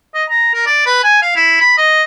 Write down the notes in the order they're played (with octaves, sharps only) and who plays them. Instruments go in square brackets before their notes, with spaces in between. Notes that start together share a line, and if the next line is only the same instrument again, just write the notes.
[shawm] D#5
A#5
A#4
D5
B4
G#5
F5
E4
B5
D#5